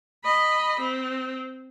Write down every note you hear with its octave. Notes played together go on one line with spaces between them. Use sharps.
D#5 B5
C4